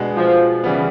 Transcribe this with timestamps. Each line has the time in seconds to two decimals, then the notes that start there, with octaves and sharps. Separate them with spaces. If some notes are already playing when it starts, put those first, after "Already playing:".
Already playing: B2 G#3 B3 D4
0.16 F3
0.64 C#3 E3 G3 B3